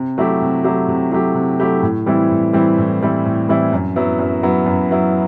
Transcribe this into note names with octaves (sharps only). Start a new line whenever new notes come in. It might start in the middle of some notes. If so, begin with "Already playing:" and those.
Already playing: C3
F#3 A3 E4 G4
C3
F#3 A3 E4 G4
C3
F#3 A3 E4 G4
C3
F#3 A3 E4 G4
A2
E3 G3 C4 E4
A2
E3 G3 C4 E4
A2
E3 G3 C4 E4
A2
E3 G3 C4 E4
F#2
F#3 B3 E4
F#2
F#3 B3 E4
F#2
F#3 B3 E4